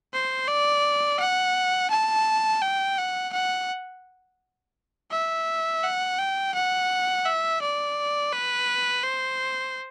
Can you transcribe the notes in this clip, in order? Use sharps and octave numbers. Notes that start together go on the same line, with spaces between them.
C5
D5
F#5
A5
G5
F#5
F#5
E5
F#5
G5
F#5
E5
D5
B4
C5